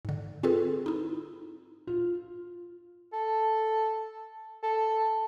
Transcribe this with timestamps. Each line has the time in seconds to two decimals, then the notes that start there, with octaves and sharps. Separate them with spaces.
0.05 G#2 D3
0.43 C4 F4 G#4 A4 B4
0.86 D#4 E4
1.87 F4
3.13 A4
4.63 A4